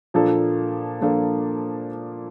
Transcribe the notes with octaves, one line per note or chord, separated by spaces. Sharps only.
A#2 F3 A#3 D4 A4
A#2 F3 A#3 D4 A4